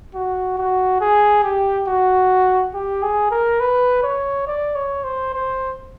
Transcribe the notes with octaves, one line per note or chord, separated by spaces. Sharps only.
F#4
F#4
G#4
G4
F#4
G4
G#4
A#4
B4
C#5
D5
C#5
C5
C5